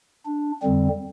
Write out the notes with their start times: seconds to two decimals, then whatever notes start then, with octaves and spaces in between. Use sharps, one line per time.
0.26 D4
0.62 F2 D3 G3 C4